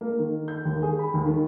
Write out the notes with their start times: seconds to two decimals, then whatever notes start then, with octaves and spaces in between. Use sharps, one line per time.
0.01 A#3
0.19 D#3
0.48 G6
0.65 D#2
0.82 G#4
0.99 B5
1.13 D#2
1.26 D#3